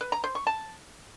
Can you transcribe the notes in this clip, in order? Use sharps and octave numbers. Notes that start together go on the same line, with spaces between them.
B4
A#5
C5
C#6
A5